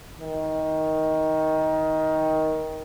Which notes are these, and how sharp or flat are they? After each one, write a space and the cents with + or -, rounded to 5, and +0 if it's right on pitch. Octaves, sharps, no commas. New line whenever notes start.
D#3 +15